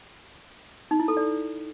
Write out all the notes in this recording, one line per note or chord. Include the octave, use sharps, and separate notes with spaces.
D#4
E4
A4
D5